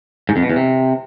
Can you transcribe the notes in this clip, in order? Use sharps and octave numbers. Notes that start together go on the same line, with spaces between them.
G#2
F2
B2
E2
C3